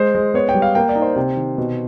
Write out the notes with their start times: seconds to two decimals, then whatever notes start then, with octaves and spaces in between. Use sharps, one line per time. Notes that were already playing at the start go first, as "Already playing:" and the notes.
Already playing: G#3 C5
0.15 G#3
0.34 B3 C#5
0.49 G5
0.54 G3
0.62 F5
0.75 A#3 G5
0.89 D5
0.95 D#4
1.02 C5
1.16 C3
1.36 D#3
1.58 B2